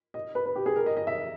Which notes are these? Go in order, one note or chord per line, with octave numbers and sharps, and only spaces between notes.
D#5
B4
B4
G4
G#4
A#4
D#5
D#5
E5